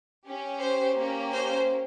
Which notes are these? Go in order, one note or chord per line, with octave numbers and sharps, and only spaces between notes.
C#4 G4
C5
A#3 C#4 G4
C5